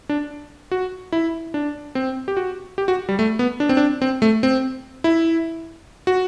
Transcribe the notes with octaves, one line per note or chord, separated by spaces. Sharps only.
D4
F#4
E4
D4
C4
G4
F#4
G4
F#4
G3
A3
B3
D4
C4
D4
C4
A3
C4
E4
F#4